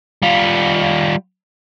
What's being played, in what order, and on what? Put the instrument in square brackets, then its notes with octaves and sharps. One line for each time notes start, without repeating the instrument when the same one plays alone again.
[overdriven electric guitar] G3 F4